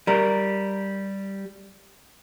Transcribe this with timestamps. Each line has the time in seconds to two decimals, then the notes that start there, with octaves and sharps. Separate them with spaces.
0.07 G3 A#4